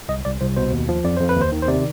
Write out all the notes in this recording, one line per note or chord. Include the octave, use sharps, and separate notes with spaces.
C2 D#5
C2 D5
C2 C5
B2 C5
D#2
F3
F2 D5
F2 C5
B4
D#2
C5
D#3
C5
C3 D5